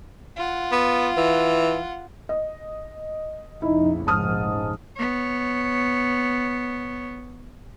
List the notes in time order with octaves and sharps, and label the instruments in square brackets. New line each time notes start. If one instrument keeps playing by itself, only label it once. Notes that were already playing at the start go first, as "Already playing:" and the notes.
[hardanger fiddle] F4 F#5
[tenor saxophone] B3
E3
[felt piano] D#5
[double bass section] F1 A#1 C#3 [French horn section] D#4 [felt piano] E4
[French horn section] G#2 [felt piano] A5 D#6 F6
[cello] B3 C#5